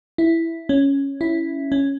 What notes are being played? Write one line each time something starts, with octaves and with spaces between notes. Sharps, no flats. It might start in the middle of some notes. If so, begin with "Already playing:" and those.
E4
C#4
E4
C#4